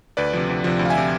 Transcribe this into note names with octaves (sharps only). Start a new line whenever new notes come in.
D2 B4 D5
C3 F3
D2
C3 F3
D2
F5
E5 G#5
C3 F3